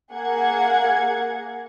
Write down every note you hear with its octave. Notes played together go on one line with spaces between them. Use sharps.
A#3 G#4 F#5 G#6